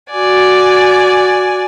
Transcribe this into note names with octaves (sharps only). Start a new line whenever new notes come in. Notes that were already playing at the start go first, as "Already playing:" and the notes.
F#4 D5 G#5